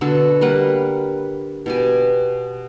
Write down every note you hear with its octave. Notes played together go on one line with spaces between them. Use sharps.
B2 D3 F#4 A4
G3 A#3 B4 F#5
B2 G4 G#5